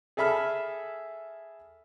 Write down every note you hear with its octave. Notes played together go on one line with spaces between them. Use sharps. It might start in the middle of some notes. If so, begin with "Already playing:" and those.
G#4 A4 E5 B5 F6